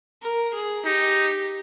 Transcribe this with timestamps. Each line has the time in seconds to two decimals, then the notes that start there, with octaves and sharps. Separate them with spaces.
0.22 A#4
0.54 G#4
0.85 D#4 G4